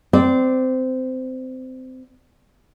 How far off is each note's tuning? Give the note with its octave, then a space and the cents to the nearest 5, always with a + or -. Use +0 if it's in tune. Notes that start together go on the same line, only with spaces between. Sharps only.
C4 -20 D5 +0